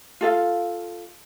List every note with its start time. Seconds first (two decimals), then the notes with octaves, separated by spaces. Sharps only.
0.21 F4 A4 F5